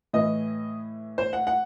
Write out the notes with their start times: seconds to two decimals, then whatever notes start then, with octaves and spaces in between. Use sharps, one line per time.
0.13 A2 E3 D#5
1.18 C5
1.33 F#5
1.47 F#5